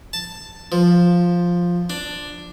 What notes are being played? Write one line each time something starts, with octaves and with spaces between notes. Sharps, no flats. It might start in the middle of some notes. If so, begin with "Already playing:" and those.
A5
F3
D4